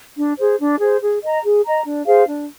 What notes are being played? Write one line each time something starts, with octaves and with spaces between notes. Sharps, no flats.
D4
G#4 C5
D4
G#4 C5
G#4
D#5 A#5
G#4
D#5 A#5
D4
G#4 C5 F5
D4